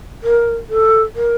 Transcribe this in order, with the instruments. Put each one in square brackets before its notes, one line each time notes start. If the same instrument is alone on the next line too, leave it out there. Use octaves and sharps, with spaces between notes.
[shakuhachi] A#4
A4
A#4